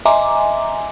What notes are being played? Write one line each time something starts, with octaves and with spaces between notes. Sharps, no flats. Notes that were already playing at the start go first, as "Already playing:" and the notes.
D#5 E5 G#5 A#5 C6 D6